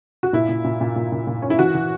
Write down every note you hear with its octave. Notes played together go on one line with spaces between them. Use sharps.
F#4
A#2 E4
A#2
A#2
A#2
A#2
A#2
A#2
C#4
E4
E3 F#4
E3